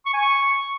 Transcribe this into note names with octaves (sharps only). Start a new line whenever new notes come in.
C#6
G#5
C#6